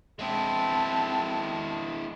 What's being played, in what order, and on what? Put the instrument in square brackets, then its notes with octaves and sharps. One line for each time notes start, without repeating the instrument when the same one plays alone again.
[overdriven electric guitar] G#3 E4 [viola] C4 A5